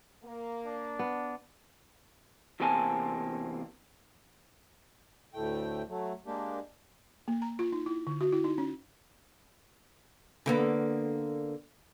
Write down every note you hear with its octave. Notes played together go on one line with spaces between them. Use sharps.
A#3
D4
B3
E2 C3 A#3 C4 G#5 A5
D2 A2 A3 G5
F#3 A3
G#3 A#3 D4 G4
A#3
A#5
F4
D#4
E4
D3
F#4
E4
D#4
C#4
D3 A#3 B3